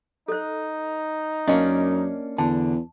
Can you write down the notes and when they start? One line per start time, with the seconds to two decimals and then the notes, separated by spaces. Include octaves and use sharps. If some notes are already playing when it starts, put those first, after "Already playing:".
0.28 D#4 A4 C5
1.48 F#2 A#3 C#4 D4 D#5
2.38 E2 D3 A5